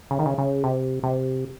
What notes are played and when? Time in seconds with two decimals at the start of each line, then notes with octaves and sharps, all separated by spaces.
0.11 C#3
0.19 D#3
0.26 C#3
0.38 C#3
0.64 C3
1.03 C3